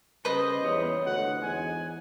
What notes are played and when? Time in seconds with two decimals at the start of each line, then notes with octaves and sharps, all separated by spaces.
0.25 C#3 G3 B4 C5 D#5
0.61 B1 E2 G#2 C#5
1.06 D2 F#5
1.42 E2 G#2 G#5